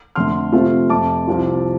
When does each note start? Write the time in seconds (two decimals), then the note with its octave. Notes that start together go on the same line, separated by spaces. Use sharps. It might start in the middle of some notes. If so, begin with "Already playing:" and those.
0.16 F2 D3 A3 C6 F6
0.52 C3 F3 A3 C4 F4
0.90 F2 C3 A3 A5 D6
1.27 C2 C3 F3 C4 F4